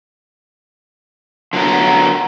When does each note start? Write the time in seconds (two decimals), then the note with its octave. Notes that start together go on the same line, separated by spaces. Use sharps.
1.53 D3 F#3 B3 A#4